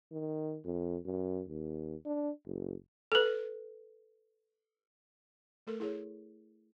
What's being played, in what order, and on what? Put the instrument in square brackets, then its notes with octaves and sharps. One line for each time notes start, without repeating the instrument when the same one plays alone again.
[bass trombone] D#3
F2
F#2
D#2
D4
F#1
[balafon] A4 B4
A3 A4 A#4
E4 G#4 C#5